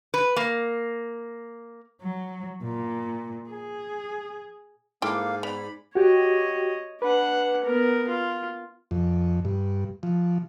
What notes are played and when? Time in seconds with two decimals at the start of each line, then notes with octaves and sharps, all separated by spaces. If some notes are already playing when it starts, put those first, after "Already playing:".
0.14 B4
0.36 A#3
2.02 F#3
2.64 A#2
3.50 G#4
5.02 G#2 G#3 A#3 E4 A4 F5 G5 D6
5.43 B3 D5 B5 F7
5.95 F#4 G4 C#5 D#5
7.02 D4 B4 F#5
7.64 B3 A#4
8.08 F4
8.91 F2
9.45 G2
10.03 F3